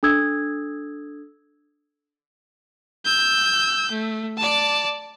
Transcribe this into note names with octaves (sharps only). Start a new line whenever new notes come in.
D4 A4 D#6 E6 G#6
E6 G6
A3
D5 A5